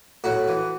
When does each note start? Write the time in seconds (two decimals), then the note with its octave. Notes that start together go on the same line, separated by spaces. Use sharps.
0.24 A2 F#4
0.48 E3